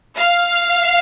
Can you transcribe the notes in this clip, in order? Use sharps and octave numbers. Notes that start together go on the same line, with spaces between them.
F5